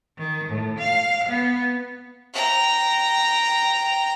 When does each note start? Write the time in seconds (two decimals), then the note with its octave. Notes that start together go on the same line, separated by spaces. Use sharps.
0.18 D#3
0.49 A2
0.79 F5
1.29 B3
2.34 G5 A#5